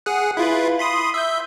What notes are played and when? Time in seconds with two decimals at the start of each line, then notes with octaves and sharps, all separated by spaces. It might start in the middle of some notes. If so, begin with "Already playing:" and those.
0.06 G#4 F#5
0.37 E4 F4 B4
0.79 B5 C6 D#6
1.14 E5 G6